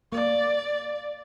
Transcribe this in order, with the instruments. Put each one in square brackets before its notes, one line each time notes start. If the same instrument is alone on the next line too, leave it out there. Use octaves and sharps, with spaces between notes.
[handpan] A#3 [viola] D5